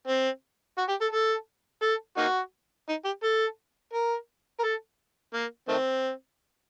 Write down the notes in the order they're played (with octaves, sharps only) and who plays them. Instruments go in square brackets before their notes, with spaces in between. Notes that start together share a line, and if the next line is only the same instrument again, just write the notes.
[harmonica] C4
F#4
G4
A4
A4
A4
A#3 D#4 F#4
D#4
G4
A4
A#4
A#4
A4
A#3
D#3 A3 C4